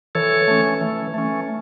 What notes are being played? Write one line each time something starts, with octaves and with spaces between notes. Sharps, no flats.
E3 A4 C#5
A3 C#4
E3
A3 C#4